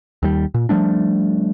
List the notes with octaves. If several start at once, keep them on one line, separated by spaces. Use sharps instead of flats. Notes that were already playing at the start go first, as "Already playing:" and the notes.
D#2 G3
A#2
F3 G3 A3 D4